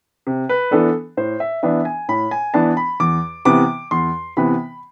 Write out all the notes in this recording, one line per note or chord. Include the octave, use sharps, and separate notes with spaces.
C3
B4
E3 B3 D4 A4
A2 C5
E5
E3 B3 D4 E5
G#5
A2 B5
G#5
E3 B3 D4 A5
B5
E2 D6
C3 E3 B3 D6
E2 C6
C3 E3 B3 B5